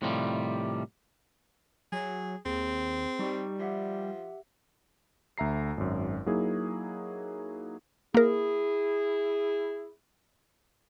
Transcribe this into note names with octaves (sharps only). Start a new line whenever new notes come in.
A2 C3 D#3 F3 G3
F#3 G#4
D#2 C4 G#4
G3 D#4 G4 C#6
F3 G4 E5 F#5
D2 E5 A#5 C7
G#1 F#2
F#3 A#3 D#4 E4 G#4
A#3 E4 G#4 A#4